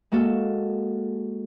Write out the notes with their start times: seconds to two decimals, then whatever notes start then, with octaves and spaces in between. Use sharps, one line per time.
0.12 G#3 A#3 F#4 A4